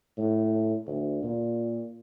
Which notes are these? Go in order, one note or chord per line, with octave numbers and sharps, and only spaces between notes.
A2
D2
A#2